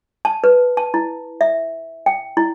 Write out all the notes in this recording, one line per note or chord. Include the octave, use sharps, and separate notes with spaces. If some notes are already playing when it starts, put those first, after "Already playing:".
A5
B4
A5
E4
E5
G5
E4